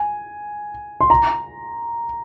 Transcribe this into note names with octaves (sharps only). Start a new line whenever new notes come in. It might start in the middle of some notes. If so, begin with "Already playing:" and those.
Already playing: G#5
C6
A#5